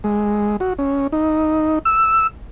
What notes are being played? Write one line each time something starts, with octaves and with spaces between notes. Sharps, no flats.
G#3
F#4
C#4
D#4
E6